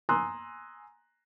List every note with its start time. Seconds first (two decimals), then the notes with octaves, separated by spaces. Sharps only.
0.09 G#5 A#5 C6 D#6 E6 F#6